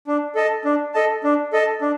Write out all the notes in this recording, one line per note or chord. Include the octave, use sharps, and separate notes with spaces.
D4
A4 D#5 A5
D4
A4 D#5 A5
D4
A4 D#5 A5
D4